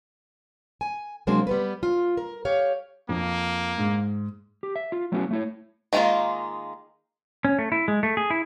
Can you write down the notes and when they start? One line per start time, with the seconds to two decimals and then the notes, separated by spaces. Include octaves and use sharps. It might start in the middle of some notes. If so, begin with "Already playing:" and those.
0.81 G#5
1.27 C3 F#3 G#3 A#3 C4 D4
1.47 G3 B3 B4
1.83 F4
2.17 A#4
2.45 G4 C#5 F5
3.09 F2 A#3
3.78 G#2
4.63 G4
4.76 E5
4.92 F4
5.12 F#3 A3 B3 C#4 E4 F#4
5.31 A3 E4 C#5
5.93 D#3 G#3 A#3 D#4 F4
7.45 C#4
7.59 A3
7.72 E4
7.88 G#3
8.03 A3
8.17 G#4
8.30 E4